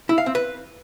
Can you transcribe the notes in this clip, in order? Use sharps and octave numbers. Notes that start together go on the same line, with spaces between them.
E4
F5
C4
B4